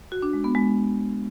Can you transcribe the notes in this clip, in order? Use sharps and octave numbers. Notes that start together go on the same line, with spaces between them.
F#4
D4
G#3
B3
G#3